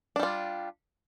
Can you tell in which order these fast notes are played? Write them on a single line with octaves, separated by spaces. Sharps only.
D4 G3 F4